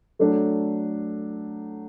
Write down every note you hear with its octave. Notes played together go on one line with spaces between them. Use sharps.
F#3 A3 D4 A4